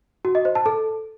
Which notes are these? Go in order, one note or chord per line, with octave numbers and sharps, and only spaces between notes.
F#4
D#5
C5
A5
A4